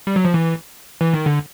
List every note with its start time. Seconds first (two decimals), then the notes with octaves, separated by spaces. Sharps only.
0.07 G3
0.16 F#3
0.25 F3
0.34 E3
1.01 E3
1.13 D#3
1.26 D3